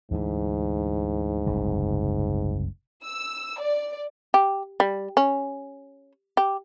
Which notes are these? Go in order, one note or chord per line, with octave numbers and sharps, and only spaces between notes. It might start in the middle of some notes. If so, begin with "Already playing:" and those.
D2 G#2 E3
F#1 C2 C#3
E6
D5
G4
G3
C#4
G4